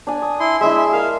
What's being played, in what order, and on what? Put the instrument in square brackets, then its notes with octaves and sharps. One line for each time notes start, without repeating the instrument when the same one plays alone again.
[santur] D4 G#5
D#6
[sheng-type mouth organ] E4 C6
[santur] G#3 D4 E4 [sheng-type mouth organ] E5
[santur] G#4 A#4 [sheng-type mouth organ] F5